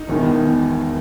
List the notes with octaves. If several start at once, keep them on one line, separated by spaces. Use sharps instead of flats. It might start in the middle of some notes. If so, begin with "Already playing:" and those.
Already playing: D#4
E1 E2 D#3